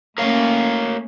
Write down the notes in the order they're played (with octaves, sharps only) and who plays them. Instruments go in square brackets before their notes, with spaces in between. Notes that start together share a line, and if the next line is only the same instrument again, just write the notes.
[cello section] A3 A#3 C#4 [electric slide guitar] A#4 C#5 F5